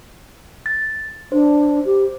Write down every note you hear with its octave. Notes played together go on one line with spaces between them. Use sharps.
A6
D4 C5
G4